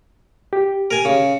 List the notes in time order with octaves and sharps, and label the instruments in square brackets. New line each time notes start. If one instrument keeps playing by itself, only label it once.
[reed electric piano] G4
[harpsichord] A#4 G#5
C#3